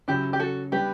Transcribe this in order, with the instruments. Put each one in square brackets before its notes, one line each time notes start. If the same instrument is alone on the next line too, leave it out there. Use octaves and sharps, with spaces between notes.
[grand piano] C#3 F#3 C#4 [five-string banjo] E4 G4
[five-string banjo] G4
F#4 A4
[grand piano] G3 B3 D4 [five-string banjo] G4 B4